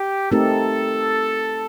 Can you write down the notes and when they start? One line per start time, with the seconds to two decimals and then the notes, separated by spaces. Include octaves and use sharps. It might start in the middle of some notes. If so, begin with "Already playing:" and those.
Already playing: G4
0.31 A3 C4 D#4 G4 A4 A#4